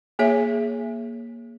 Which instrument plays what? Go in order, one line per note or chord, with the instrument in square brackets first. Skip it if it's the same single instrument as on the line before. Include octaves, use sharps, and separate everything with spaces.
[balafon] A#3 G#4 C#5 E5